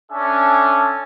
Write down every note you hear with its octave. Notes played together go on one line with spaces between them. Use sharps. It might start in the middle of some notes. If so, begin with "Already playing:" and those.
C#4 D4 A4 E5 G#5